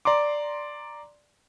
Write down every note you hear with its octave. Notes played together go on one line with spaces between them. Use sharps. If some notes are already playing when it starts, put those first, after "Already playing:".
D5 A#5 C6 D6